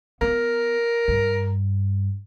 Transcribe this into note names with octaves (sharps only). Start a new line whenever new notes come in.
B3 A#4
G2